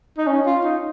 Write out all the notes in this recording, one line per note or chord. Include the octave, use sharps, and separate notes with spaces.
D#4
C#4
F4
D#4